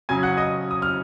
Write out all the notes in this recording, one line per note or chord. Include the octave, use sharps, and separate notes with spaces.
C#3 F#3 C#4 G#5 G#6
F#5 F#6
D#5 D#6
D#6
F6